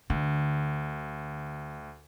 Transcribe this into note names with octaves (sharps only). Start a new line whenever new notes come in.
D2 D3